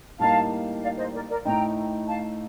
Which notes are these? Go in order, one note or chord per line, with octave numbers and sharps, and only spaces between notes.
A2 G3 A#3 D#4 F5 A5
D5 F5
C5 D#5
A#4 D5
A#4 D5
A2 A3 D#4 G5 A#5
F5 A5